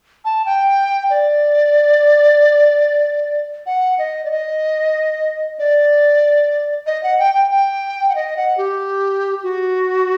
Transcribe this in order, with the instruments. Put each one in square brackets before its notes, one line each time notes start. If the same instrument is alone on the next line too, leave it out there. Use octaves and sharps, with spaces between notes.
[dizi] A5
G5
D5
F#5
D#5
D5
D#5
D5
D#5
F#5
G5
G5
G5
F#5
D#5
F#5
G4
F#4